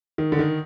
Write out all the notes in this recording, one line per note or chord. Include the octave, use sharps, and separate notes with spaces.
D#3
D3
D#3